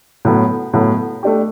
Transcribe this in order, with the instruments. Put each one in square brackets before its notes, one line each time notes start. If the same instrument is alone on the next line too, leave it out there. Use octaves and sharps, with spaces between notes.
[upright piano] A2 F#3 B3
A2 F#3 B3
A3 D4 G4